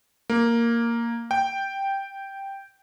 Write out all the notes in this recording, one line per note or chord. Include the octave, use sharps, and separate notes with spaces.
A#3
G5